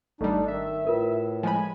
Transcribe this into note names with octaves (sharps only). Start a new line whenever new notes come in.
G#1 G3 A3 D4 D#4
D#3 E5
A2 F4 A#4 B4
F3 G#3 G#5 B5